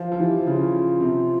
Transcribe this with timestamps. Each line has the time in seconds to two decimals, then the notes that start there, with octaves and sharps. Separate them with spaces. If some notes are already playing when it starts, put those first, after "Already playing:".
Already playing: F3
0.12 F3
0.19 E3 G4
0.47 C#3 F4
1.01 C3